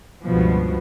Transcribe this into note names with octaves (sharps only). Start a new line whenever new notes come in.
C#2 G2 B2 F3 B3